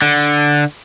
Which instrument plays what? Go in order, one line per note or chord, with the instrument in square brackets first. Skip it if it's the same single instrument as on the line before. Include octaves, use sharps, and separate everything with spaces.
[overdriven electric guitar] D3